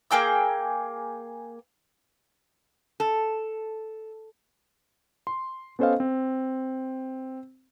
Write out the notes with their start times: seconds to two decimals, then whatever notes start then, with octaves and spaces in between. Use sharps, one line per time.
0.11 A#3 G#4 G5 E6
3.00 A4
5.27 C6
5.79 B3 C#4 A4 C5 D#5 F5
6.00 C4